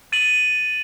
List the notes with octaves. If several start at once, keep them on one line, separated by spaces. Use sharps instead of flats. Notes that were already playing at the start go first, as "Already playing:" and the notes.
A6 D#7 F#7